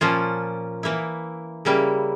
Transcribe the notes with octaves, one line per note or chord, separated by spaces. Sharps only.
A#2 F3 A#3 C#4 F4
E3 A#3 E4
C#3 G3 A#3 E4